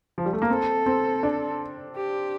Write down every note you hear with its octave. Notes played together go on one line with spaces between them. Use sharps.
F3
G3
A3
A#3
C4 A4
C4
D4
G4